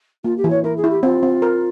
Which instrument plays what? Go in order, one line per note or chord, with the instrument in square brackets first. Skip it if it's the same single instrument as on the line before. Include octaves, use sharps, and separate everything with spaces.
[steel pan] A#3 [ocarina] F4
[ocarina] G4
[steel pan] E3
[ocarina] C#5
[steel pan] E4 [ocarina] A#4
[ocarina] G#4
[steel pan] E4
[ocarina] G4
[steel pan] C4 [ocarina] F4
[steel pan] C4
A#4